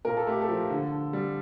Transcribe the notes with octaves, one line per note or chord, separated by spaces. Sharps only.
A#2 A#4
A4
A3 G4
A4
F3
D3
D3
G3